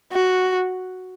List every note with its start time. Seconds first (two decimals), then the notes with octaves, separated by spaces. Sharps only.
0.12 F#4